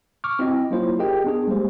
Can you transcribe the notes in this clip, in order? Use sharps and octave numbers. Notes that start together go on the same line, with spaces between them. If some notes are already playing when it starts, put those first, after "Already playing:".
C#6 D6 F6
C4 E4 F#4 D#5 G5
F#3 A#3 C#4 E4 F4 C5
G4 G#4 A#4 D#5 G5
B3 D4 G#4
G3 G#3 A#3 G4 C5